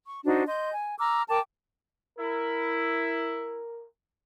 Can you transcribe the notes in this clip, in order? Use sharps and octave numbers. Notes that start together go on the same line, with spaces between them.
C#6
D4 D#4 F#4 C5
D#5 C6 G6
G#5
A#5 D6 E6 F6
A#4 G5 A5 D6
E4 A#4